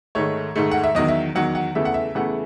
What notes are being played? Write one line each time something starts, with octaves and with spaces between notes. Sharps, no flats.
G#2 D#3 A3 C#5
G#2 D#3 A3
F#5
E5
E2 D#3 F#3 D#5
E5
E2 D#3 F#3 F#5
F#5
E2 C#3 E3 A3 E5
F#5
E5
E2 C#3 E3 A3 F#5